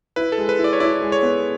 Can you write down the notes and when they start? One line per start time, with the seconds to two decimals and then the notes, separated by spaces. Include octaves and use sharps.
0.16 E4 B4
0.32 A4
0.38 G#3
0.49 B4
0.59 E4
0.64 D5
0.73 C#5
0.80 E4 D5
1.02 G#3
1.12 C#5
1.23 B3